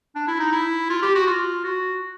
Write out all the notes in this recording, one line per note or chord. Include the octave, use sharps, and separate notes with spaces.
D4
E4
D#4
E4
F4
G4
F#4
F4
F#4